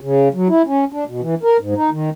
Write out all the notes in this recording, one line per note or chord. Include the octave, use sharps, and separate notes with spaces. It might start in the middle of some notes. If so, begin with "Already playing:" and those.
C#3
F#3
E4
C#4
D4
B2
E3
A#4
G#2
D#4
D#3